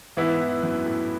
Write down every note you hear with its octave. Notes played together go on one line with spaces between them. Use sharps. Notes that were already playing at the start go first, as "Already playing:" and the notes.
G#2 E3 B3 E4
E2
F#2
A2